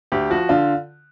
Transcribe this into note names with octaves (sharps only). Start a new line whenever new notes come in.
D2 G4
F3 F#4
D3 F4